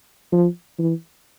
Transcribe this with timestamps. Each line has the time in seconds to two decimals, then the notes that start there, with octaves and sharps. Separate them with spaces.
0.32 F3
0.79 E3